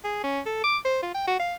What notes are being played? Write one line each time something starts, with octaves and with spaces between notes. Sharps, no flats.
G#4
C#4
A4
D6
C5
F4
G5
F#4
F5